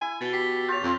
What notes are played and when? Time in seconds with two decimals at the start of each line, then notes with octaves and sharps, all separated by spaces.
0.01 E4 G#5
0.21 B2 B4 A6 G7
0.33 G4 B6 C7
0.68 F4 C#5 G6 F7
0.83 F2 C4 A#5